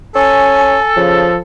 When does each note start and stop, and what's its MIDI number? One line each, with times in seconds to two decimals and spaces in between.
0.15 0.77 61
0.15 1.40 69
0.15 0.96 80
0.97 1.29 49
0.97 1.38 53